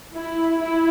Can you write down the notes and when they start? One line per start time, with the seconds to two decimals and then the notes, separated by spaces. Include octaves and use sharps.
0.13 E4
0.59 E4